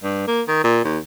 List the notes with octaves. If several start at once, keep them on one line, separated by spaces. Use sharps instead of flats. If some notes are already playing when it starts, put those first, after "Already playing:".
G2
A#3
D#3
A#2
D#2